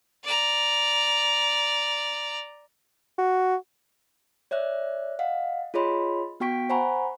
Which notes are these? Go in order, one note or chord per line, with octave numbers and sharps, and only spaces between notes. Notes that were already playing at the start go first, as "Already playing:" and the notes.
D5 A#5
F#4
C#5 D5 E5 F#6
D#5 F5 F#5
F4 G#4 C#5 D#5 B5 C6
B3 F#4 G5 C#6 B6 D7
C5 F#5 G#5 A#5 B5 C#6